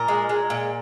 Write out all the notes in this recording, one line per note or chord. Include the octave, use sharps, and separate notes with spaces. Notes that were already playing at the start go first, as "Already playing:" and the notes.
Already playing: A#2 A#4
G#3
G#3
A#2